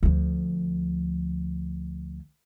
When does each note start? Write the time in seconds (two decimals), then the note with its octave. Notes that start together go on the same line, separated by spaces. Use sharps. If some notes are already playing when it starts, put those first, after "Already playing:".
0.03 D2 F3